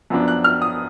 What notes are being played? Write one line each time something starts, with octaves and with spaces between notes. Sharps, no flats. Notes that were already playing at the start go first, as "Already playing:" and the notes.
F#2 F3 B3 D4
F#6
F6
D#6